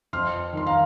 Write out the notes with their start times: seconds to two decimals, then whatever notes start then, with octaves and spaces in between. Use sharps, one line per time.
0.13 F2 C6 F6
0.53 D#3 C6
0.67 F5 A#5